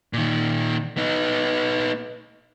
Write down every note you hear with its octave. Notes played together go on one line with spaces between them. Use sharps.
A#2 D#3
B3 D#4